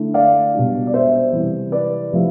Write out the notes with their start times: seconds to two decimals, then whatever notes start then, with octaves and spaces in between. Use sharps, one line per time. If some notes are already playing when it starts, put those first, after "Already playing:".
Already playing: D3 A3 E4
0.14 D5 F5
0.55 B2 G3 D4
0.87 D5
0.94 C5 E5
1.33 C3 E3 G3 C4 E4
1.72 B4 D5
2.12 C3 F3 A3 E4